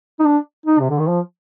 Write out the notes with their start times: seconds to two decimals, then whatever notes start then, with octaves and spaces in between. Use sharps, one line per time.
0.19 D#4
0.25 D4
0.66 D#4
0.80 C3
0.90 D3
0.99 D#3
1.07 F3